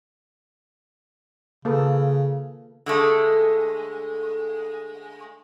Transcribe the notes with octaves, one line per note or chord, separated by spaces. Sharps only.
C#3 A#3 A4 B4
D3 G#3 A3